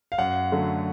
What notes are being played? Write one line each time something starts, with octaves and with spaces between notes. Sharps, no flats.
F5
F#2 F#5
D3 F#3 A3